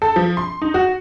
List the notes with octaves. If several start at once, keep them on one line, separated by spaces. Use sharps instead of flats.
A4
F3
C6
D#4
F#4